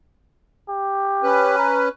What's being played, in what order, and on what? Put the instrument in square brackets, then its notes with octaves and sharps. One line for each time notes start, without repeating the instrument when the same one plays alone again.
[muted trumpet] G4
[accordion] C#4 B4
[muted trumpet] A#5